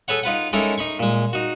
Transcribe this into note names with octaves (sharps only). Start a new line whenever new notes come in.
G#4 A4 B4 C#5 F#5
D#4 F4 B4 F#5
G#3 C#4 D#4 E4 A4 A#4
D#4 B5 C#6
A#2 G#3
D#4 F#4